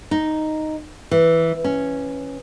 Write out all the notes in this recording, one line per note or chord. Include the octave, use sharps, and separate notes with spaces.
D#4
E3
C#4